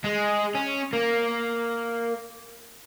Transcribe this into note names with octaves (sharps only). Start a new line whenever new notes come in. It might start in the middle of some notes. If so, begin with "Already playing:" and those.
G#3
C#4
A#3